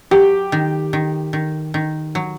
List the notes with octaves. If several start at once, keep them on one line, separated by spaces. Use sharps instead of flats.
F#3 G4
D#3
D#3
D#3
D#3
F#3